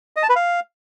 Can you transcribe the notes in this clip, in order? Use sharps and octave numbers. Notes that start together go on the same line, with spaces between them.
D#5
A5
B4
F5